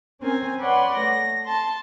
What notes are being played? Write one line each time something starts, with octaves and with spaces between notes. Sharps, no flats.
C4 C#4 A#4 G#5
B4 C#5 D5 F#5 C6
A3 A#6
A5 C6